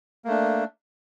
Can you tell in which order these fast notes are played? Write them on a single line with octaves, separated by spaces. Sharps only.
A#3 A3 D4